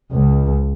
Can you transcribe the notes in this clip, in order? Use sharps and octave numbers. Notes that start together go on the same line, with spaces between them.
C#2